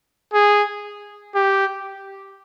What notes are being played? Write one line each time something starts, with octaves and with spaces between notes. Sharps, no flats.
G#4
G4